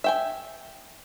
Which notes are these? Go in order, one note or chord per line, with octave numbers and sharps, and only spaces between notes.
E5 G5 G#5